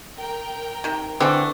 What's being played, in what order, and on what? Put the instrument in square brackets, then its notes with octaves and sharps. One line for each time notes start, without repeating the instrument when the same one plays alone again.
[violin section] A#4 G5
[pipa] C3 D#3
[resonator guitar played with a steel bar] D3 [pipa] E3 A3 [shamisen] C4